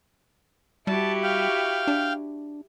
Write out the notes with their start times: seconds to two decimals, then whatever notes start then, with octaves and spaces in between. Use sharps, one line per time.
0.87 G3 E4 F#4 G4 A5
1.23 F5 G5
1.87 D4